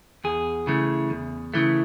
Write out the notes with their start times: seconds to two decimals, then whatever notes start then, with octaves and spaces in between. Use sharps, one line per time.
0.24 E2 G#4
0.67 C#3 E3 A3
1.10 E2
1.54 C#3 E3 A3